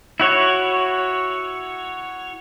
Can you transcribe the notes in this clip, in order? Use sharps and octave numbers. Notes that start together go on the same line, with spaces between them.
E4 F#4 C#5